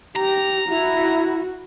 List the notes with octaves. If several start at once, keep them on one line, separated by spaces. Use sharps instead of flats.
G4 A#5
E4 F#4